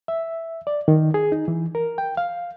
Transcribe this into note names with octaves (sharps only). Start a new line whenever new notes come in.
E5
D5
D#3
G#4
D#4
E3
A#4
G5
F5